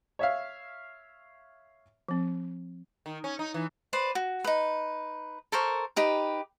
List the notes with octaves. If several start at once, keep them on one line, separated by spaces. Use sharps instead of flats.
C#5 E5 F5
F3 C4
D#3
C#4
D#4
E3
B4 C5 D5
F#4
D#4 B4
A4 A#4 C5 C#6
D#4 G4 B4